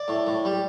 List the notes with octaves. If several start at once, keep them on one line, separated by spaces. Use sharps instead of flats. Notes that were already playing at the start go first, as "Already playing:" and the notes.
Already playing: D5
A2
A2
G3